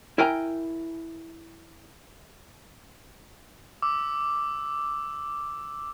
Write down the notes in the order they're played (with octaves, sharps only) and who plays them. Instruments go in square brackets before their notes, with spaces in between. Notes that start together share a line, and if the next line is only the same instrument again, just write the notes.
[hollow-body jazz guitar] E4 A#4 G5 G#5 A#5
[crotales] D6 E6